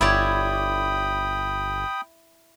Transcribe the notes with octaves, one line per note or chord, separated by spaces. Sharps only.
G1 E4 C#5 D5 G5 B5 D#6